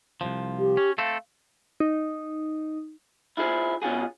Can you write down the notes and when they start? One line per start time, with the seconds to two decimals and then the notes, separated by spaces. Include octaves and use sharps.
0.21 C2 F#2 F3
0.58 G4
0.77 C#4
0.98 A3 C4 A4 F5
1.80 D#4
3.37 E4 F4 G#4 C5
3.82 B2 C#4 F4 F#4 G#4